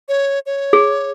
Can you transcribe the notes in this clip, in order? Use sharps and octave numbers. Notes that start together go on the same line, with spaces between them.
C#5
C#5
G#4